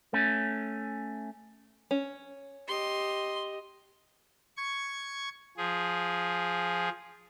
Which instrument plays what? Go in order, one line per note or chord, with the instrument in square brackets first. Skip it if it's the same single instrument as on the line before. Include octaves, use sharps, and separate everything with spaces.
[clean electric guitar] A3 C#4
[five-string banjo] C#4
[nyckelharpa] G4 D#5 [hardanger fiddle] C6
[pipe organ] C#6 G#6
F3 G#4